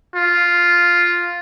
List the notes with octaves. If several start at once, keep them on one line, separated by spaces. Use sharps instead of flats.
F4